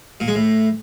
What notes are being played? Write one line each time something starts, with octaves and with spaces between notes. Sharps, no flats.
A#2
G#3
A2